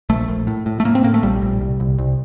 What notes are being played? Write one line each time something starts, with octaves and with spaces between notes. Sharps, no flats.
A#1 A3
A#1
A2
A2
A3
A2 A#3
C4
A2 A#3
A3
A#1 G3
A#1
C2
C2
C2